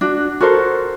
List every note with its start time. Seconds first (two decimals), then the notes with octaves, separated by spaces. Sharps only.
0.01 D4 F#4
0.40 F#4 A4 A#4 C5